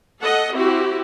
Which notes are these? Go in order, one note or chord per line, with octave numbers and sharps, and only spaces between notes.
A4 D#5 F#5
C4 E4 F#4 G4